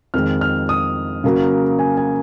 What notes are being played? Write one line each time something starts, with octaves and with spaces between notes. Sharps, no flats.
F2 D#3 G#3 F6
F6
D#6
C#3 F#3 A#3
G#5
G#5